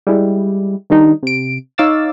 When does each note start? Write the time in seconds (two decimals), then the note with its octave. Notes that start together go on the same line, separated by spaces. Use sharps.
0.07 G3 G#3 E4 G4
0.90 D#3 G3 D4 D#4
1.23 C3 D7
1.78 D#4 C#5 F5 D6 E6 A6